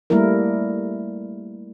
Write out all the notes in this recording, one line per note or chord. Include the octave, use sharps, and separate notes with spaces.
G3 A3 A#3 E4 A#4